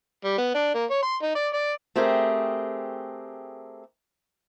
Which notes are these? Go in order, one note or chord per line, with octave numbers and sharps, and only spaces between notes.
G3
B3
D4
A#3
C#5
C6
D#4
D5
D5
A3 C4 G4 G#4 A#4